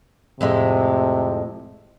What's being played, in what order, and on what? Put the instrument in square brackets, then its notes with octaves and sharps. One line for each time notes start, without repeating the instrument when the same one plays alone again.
[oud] F2 A2 G#3 [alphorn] C3